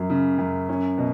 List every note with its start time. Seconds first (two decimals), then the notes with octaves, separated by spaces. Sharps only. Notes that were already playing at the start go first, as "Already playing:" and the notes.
Already playing: F#2 F#3
0.10 C#3
0.38 F#2
0.69 C#4
0.98 B2